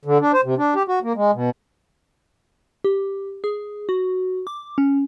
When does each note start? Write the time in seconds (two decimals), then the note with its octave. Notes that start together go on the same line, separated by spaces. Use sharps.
0.05 D3
0.21 D4
0.33 C5
0.44 C3
0.58 D4
0.75 G4
0.88 F#4
1.03 A#3
1.16 G#3
1.34 B2
2.84 G4
3.44 G#4
3.89 F#4
4.47 D6
4.78 C#4